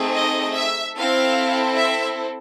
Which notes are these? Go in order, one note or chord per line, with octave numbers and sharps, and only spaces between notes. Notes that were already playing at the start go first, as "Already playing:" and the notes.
Already playing: A3 C4 D#4 G#4
D#5
E5
C4 E4 A4 F5
E5